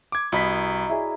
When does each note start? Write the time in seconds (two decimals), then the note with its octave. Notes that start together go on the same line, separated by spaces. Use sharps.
0.12 D6 G#6
0.32 C2 F#4 A#4 D#5 B5 B6
0.89 E4 G#4 D5